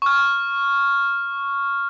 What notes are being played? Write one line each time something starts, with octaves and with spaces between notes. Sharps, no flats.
C#6 F6